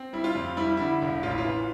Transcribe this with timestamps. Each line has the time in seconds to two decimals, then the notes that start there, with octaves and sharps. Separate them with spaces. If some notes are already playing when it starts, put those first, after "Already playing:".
Already playing: C4
0.13 G3 E4
0.24 F4
0.35 F2
0.57 G3 E4
0.77 D3 E4
1.02 E1
1.23 A1 F4
1.31 E4
1.38 F4
1.45 E3